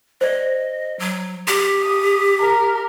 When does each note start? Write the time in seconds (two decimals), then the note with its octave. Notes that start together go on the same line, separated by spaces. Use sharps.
0.21 C5 D5 D#5
0.99 F#3
1.48 G4
1.82 D#6
2.40 A#4